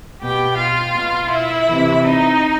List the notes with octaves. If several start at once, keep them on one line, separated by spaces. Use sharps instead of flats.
B2 G4 G5
F4 F5
B2
E4 E5
C3 E3
D#4 D#5